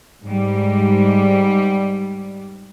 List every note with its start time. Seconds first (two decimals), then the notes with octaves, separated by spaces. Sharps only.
0.23 G#2 G3